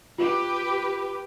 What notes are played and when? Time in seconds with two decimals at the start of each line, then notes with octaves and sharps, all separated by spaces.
0.18 F4 G4 B4